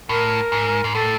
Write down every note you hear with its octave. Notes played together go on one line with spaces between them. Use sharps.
A2 A#4
G#2
G#2
A2 A4